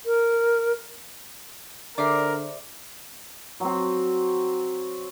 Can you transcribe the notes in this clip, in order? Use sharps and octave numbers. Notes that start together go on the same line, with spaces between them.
A#4
D3 G#4 A#4 C5 D5 E5 D6
F#3 C4